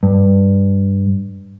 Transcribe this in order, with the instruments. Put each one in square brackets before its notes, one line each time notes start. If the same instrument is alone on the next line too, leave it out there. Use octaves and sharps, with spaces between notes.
[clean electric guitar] G2